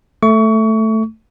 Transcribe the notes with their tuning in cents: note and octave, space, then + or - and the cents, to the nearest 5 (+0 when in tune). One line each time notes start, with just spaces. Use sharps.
A3 +0 C#6 +30